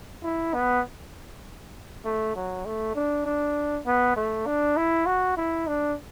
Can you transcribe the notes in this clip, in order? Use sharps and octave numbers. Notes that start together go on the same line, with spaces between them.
E4
B3
A3
F#3
A3
D4
D4
B3
A3
D4
E4
F#4
E4
D4